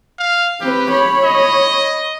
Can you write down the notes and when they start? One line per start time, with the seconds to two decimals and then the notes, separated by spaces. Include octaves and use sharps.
0.19 F5
0.61 C4 G4 B4
0.91 C#5 B5
1.23 D#5